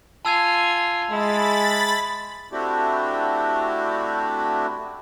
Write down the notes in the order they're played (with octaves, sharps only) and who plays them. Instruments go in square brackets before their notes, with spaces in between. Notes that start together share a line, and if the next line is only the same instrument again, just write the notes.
[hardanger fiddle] F4 G#5 [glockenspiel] A5 E6 G#6
[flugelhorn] G#3 [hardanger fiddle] E4 [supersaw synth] B5 A6
[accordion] A3 C4 D4 E4 F#4 G4